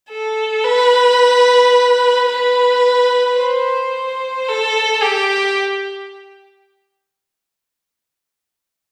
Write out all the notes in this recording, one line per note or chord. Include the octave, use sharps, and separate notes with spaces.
A4
B4
B4
C5
A4
G4